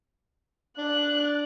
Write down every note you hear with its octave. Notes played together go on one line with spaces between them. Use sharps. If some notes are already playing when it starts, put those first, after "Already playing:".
D4 F#6